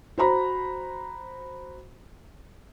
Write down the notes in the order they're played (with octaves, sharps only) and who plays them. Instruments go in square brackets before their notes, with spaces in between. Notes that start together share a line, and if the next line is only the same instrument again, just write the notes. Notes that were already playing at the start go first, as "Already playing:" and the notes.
[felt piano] F#4 C5 A#5 B5